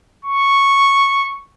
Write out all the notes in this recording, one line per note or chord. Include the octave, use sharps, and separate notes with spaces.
C#6